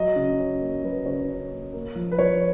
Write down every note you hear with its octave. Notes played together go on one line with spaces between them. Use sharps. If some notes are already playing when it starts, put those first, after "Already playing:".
Already playing: F#3 D#5
C#3
C#4
A#3
F#3 B4
C#3 C#5
C#4
A#3
A#3
F3
B4
F3 C#5